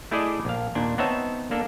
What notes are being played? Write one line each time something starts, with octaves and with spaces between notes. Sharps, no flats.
A3 E4 G#4 D5 D#5
A#1 F5
D#2 A#2 D4
B3 C4 D#4 C#5 E5 A5
A#3 D4 A4